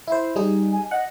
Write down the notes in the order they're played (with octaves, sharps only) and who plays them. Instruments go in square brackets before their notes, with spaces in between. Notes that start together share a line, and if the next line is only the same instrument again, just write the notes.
[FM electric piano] E4 C5
G3 D#4 G#4
[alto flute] G#5
[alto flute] D#5 [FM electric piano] F#5